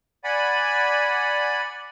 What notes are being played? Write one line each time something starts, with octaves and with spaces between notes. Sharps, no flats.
D5 F#5 G#5 B5